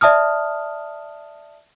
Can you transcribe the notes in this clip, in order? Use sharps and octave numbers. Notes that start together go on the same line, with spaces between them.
D5 E5 A5 D#6 F6